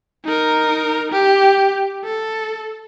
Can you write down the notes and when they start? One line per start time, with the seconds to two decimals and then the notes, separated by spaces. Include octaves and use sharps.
0.25 D#4 A#4
1.12 G4
2.04 A4